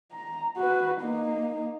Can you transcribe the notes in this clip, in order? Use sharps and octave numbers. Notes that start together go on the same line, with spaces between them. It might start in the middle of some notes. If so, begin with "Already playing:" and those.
A#5
F#4 B4
A#3 D#4